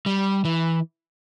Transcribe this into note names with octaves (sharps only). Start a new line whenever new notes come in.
G3
E3